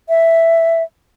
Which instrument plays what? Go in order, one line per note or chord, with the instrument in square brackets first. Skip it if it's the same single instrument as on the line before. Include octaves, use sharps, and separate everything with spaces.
[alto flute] E5